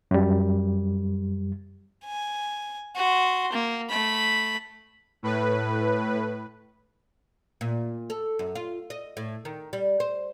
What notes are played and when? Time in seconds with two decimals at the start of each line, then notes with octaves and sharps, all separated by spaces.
0.11 F#2 G3
2.05 G#5
2.96 F#4 C6
3.53 A#3
3.90 A3 B5
5.23 A2 B4
7.61 A#2
8.10 A4
8.39 F#2
8.55 F4
8.90 D#5
9.17 A2
9.45 D#3
9.73 G3
10.00 C5